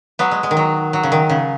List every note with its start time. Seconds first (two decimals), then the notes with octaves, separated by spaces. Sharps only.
0.19 F#3 B3
0.31 G#3
0.43 G#3
0.51 D#3
0.57 F#3
0.93 F#3
1.03 C#3
1.12 D#3
1.29 C#3